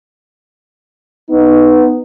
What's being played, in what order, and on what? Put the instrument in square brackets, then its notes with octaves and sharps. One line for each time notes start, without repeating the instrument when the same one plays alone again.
[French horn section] B3 D#4